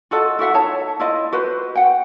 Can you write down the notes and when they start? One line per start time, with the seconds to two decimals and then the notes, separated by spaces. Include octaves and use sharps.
0.11 F4 F#4 A4 D#5
0.39 E4 F#4 E5 F#5
0.54 D#4 C#5 A5
1.00 E4 F4 D#5
1.32 F#4 B4 C5
1.75 F#5 G5